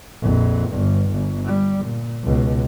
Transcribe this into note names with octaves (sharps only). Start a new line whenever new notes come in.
A#1 F2
G1 G2
G1
G3
A#2
C#2 B2